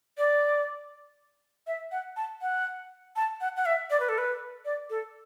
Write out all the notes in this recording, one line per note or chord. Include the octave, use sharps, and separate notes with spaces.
D5
E5
F#5
A5
F#5
A5
F#5
F#5
E5
D5
B4
A4
B4
D5
A4